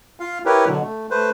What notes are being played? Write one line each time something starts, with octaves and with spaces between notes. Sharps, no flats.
F4 F5
E4 G4 A#4 B4 C#5
B2 D3 F#3
A3
A3 B4 C5